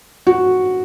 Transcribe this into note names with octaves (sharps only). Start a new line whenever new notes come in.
F#4